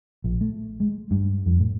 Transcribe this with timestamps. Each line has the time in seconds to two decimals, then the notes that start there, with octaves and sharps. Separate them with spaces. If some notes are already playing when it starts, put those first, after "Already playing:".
0.24 A#1
0.41 A3
0.80 G#3
1.11 G2
1.46 F2
1.60 A2